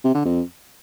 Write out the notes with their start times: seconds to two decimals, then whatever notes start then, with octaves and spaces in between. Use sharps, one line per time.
0.04 C3
0.15 D3
0.25 F2